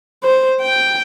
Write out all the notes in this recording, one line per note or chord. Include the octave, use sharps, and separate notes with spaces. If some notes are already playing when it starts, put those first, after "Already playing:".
C5
G5